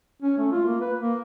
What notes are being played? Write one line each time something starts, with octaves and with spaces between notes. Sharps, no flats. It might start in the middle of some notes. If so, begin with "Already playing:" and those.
C#4
A3
F4
A#3
B4
A#3